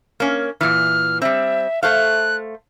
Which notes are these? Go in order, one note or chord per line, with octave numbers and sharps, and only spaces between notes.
A#3 C#4
A#2 E3 F6
G3 C4 E5
A3 C5 F5 F#6